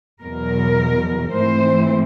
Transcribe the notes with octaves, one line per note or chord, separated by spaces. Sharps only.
E2 B2 F#3 A#4
G#2 E3 A3 C4 C5